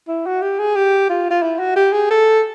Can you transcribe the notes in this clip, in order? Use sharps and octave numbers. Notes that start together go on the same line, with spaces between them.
E4
F#4
G4
G#4
G4
F4
F4
E4
F#4
G4
G#4
A4